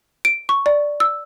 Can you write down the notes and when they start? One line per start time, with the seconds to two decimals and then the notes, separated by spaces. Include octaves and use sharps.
0.25 D7
0.49 C#6
0.66 D5
1.00 E6